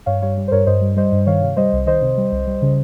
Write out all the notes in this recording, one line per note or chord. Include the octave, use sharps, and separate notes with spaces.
G2 C#5 F5
G3 C#5 F5
G3
C5
G2 A#4 C#5
G2 C5 D#5
G3
G3 C5 D#5
G2
D#3 C#5 F5
C3
G3 C5 D#5
C2
D#3 C5 D#5
C3
G3
C2
G3
C#3